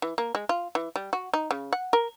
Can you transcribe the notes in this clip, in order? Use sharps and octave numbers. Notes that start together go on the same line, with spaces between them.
E3
A#3
G#3
F4
E3
G3
F#4
D#4
C#3
F#5
A#4